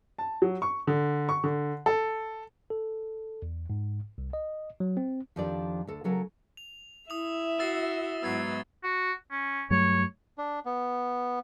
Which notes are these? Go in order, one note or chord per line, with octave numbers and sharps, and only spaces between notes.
A5
F#3
C#6
D3
C#6
D3
A4
A4
E2
G#2
C2
D#5
F#3
C4
F2 D#3 F3 D4 G4 D5
D2 A4
C#3 F#3 A4 A#4
F7
E4 E5 D#6 F7
F#4 E6 A6 C7
G#2 F#3 B3 E6 G#6 C7
F#4
C#4
G2 F#3 A3 C#5
D4
B3